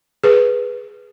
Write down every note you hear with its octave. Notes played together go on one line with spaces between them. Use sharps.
G#4 B4